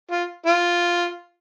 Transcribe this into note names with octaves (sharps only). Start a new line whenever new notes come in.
F4
F4